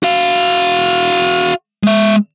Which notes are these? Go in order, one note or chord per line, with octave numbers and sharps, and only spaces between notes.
F#4 F5
G#3 E5